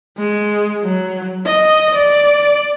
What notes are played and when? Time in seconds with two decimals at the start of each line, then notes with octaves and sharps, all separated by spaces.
0.18 G#3
0.84 F#3
1.45 D#5
1.95 D5